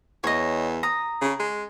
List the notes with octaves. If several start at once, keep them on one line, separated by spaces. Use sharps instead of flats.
E2 C#5 D#5
A#5 D#6
C#3
G#3